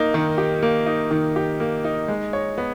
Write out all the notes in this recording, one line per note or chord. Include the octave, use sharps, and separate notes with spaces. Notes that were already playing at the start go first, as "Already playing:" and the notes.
Already playing: A#3 D#4
D#3
G4
A#3
D#4
D#3
G4
A#3
D#4
G#3
C#5
B3